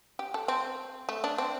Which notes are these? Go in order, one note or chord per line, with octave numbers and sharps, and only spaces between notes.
G4
A4
C4
A3
D4
C4